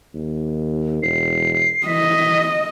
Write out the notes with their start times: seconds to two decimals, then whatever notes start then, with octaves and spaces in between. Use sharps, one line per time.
0.14 D#2
1.03 E1 C7
1.87 E3 D#5 B6